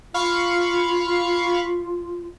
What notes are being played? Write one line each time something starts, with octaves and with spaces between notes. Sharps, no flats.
F4 F5 B5 C#6